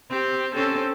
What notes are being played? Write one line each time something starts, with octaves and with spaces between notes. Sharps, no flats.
C4 G4
C4 C#4 A4